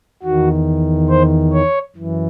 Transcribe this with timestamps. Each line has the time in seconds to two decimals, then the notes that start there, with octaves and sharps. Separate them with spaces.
0.23 E2 D#3 F#4
1.09 C5
1.53 C#5
1.96 F#2 E3